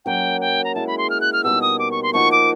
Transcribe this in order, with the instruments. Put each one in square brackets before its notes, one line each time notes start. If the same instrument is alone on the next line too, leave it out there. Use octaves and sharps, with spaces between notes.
[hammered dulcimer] F#3 A#3 C#4 [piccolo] G5
[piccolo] G5
A#5
[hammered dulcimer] G#3 C#4 E4 G#4 [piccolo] A5
[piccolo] B5
C6
F6
F#6
F6
[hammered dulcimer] B2 G3 A#3 D#4 [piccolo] E6
[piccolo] D#6
D6
C#6
C6
[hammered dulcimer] F3 A#3 D#4 F#4 [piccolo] C#6
[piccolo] D6